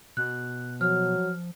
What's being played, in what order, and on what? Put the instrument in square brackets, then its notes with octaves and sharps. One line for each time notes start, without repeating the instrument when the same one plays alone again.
[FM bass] B2 [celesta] F#6
[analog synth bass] F3 [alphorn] F#3 [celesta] F6